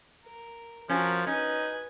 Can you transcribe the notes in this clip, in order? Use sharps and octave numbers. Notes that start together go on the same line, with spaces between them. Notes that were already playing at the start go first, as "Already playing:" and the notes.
A#4
F3 C#4 F#4 A#4
C#4 D#4 B4 G#5